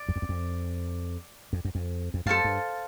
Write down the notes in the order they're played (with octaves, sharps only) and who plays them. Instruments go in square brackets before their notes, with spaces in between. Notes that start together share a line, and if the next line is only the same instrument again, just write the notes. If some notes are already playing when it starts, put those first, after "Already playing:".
Already playing: [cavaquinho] D5
[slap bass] F#2
F2
E2
F2
F2
F#2
F2
F2
[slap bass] F#2 [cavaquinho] A4 C5 F5 A5
[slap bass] G2